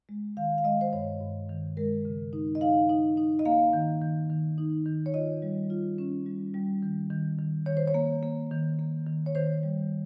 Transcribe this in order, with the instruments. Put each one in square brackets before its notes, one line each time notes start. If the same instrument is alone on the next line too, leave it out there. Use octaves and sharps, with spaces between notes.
[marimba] G#3
D#3 F5
F5
G#3 D#5
C5
G2 C#5
G2
D#3
G#3 A#4
C#3
D#4
D#5
D#4 F5
D#4
D#4
D#5
A#3 F5
D#3
D#3
D#3
D#4
D#3
C#5
F4 D#5
G3
F4
C#4
G3
G3
D#3
D#3
D#3
D#3 C#5
C5
C#5
A#3
A#3
D#3
A#3
D#3
C#5
D#3 C5
G3